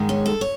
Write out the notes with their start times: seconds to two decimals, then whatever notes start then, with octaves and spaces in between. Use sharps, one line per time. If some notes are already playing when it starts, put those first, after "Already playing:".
Already playing: G#2 D#3 G#3
0.09 C#4
0.26 A4
0.41 C#5